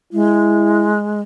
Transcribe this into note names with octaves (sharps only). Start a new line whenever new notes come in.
G#3 E4